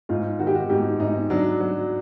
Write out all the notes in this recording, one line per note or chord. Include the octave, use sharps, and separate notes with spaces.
G#2 F4
D#3 F#4
G4
F#4
G#2 G4
G#2 D#4
F#3 D4
F#3